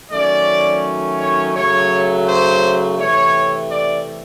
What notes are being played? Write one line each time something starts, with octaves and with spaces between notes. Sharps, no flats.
D#3 F#3 A3 C#4 D5
C#5
C#3 F#3 A3 C#5
C5
C3 E3 A3 C#5
D5